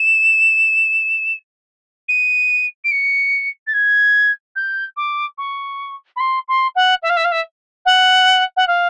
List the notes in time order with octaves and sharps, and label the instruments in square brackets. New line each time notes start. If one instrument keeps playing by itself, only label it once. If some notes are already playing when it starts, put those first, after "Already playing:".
Already playing: [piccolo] E7
D#7
D7
C#7
A6
G#6
G6
D6
C#6
B5
C6
C6
F#5
E5
F5
E5
F5
E5
F#5
F#5
F5